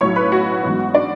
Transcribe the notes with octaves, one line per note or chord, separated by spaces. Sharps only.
B1 A2 F#3 C#5 C#6
B4 B5
F#4 F#5
A1 G#2 F#3 B3
D4 D5